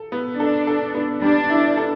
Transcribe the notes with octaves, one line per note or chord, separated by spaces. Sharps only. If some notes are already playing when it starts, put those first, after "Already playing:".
Already playing: A4
B3
D4 A4
A4
B3
G3 D4
E4
A4